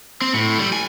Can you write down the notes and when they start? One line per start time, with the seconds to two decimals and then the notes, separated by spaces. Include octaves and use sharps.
0.21 C4
0.34 A2
0.59 G3
0.73 G#5